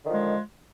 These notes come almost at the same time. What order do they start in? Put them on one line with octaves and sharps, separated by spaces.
D3 D#3 F3 G#3